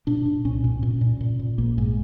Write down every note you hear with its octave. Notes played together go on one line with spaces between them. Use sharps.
A#2 D4
A#2
C2 C#4
A#2
A#2 C#4
A#2
A#2
A#2
A#1 A#3
G#2